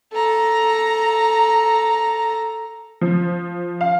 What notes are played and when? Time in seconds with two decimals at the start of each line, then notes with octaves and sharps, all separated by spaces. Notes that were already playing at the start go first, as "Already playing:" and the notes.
0.13 A4 A#5
3.01 F3
3.81 F5